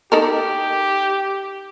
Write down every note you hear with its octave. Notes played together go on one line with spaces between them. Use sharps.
D#4 G4 A4 A#4